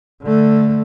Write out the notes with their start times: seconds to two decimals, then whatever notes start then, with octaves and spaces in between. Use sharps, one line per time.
0.22 D3 A3